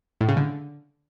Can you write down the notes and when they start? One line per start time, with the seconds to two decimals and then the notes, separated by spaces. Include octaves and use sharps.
0.21 A2
0.29 C#3
0.37 D3